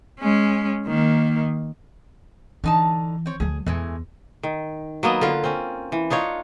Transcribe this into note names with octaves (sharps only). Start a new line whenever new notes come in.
G#3 C#4
D#3 A#3
D3 E3 D#4 A5
C4 C5 C#5
D2 F#3 G#4
E2 E3 G#3 A3
D#3
F#3 A#3 B3 D#5
D3 F4 A#4
C4 C#4
E3
D4 D#4 F4 C#5